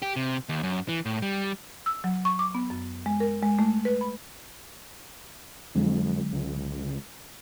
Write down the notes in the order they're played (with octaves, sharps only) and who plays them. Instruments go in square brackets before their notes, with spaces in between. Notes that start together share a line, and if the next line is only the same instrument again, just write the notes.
[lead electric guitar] G4
C3
D#2
F#2
E3
A2
G3
[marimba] E6
F#3
C#6
D6
B3
F#2
G#3
A#4
G#3
A3
B4
B5
[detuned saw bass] F2 [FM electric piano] D3 F#3 G#3
[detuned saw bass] C#2